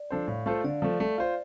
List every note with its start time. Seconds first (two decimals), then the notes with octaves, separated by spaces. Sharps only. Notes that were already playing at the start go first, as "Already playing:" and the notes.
Already playing: D5
0.10 F3 D4 A4 C5
0.28 A2 F5
0.46 A3 F4 A4 C5
0.64 D3 D5
0.82 F3 A3
1.00 A3
1.18 F4 C5